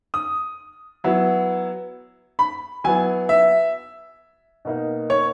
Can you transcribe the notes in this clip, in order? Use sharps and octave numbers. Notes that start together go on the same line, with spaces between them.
D#6
F#3 B3 E4
B5
F#3 B3 E4 G#5
E5
B2 A#3 D#4
C#5